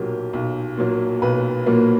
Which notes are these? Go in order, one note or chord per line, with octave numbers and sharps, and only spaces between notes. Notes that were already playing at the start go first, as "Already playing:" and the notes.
Already playing: B1 A#2 F#3 A#3 G4
B1
A#2 F#3 A#3
B1 B4
A#2 F#3 A#3